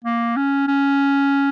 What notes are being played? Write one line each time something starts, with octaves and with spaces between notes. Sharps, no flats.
A#3
C#4
C#4